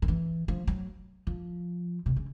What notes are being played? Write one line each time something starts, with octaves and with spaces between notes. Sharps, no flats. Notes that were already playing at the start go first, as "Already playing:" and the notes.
D#3
E3
F3
F#3
F3
C3
C#3